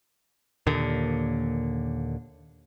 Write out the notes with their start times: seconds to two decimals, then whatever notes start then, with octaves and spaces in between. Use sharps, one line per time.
0.67 D#2 A#2 D3